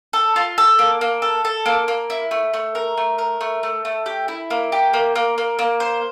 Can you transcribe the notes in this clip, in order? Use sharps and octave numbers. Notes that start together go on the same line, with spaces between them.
A4
F4
A4
A#3
A#3
A4
A4
A#3
A#3
E4
A3
A3
A#4
A3
A#4
A3
A3
A3
G4
E4
A#3
G4
A#3
A#3
A#3
A#3
C5